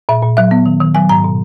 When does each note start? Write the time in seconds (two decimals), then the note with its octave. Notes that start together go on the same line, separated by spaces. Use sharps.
0.09 A#2 E5
0.22 A#2
0.37 F#3 E5
0.51 B3
0.66 D#3
0.80 D#3
0.95 F#3 G#5
1.09 G#2 A#5
1.24 B2